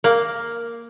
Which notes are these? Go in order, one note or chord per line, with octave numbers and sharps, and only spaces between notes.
A#3